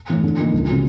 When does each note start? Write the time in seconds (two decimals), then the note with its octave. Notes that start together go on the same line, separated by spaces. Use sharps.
0.09 A2 E3
0.23 D3
0.39 F3 A#3 D#4
0.53 C#2
0.68 C#3 F#3